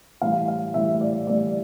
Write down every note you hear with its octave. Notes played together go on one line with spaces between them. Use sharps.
A2 E3 G3 F5
F5
A2 E3 G3 E5
D5
A2 E3 G3 D5